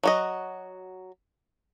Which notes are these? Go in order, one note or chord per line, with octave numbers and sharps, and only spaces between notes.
F#3 F#4 D#5